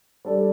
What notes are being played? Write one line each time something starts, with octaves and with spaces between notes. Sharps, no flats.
G3 D4 A4 D5